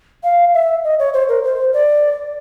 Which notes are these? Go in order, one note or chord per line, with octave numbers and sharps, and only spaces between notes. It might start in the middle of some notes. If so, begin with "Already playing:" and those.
F5
E5
D#5
C#5
C5
A#4
C5
D5